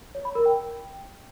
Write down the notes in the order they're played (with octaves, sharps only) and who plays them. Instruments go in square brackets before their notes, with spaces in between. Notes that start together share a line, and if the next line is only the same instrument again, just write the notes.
[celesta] C#5
B5
A#4
G5